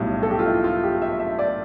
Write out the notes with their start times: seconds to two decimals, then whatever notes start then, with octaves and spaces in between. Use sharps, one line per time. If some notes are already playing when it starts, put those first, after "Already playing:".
Already playing: B1 A2 G3
0.23 A4
0.31 G4
0.39 F4
0.46 E4
0.64 F4
0.83 G4
1.02 E5
1.20 E5
1.39 D5